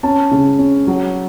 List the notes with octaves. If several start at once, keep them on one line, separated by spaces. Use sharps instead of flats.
C#4 A5
C#3
C#4
F#3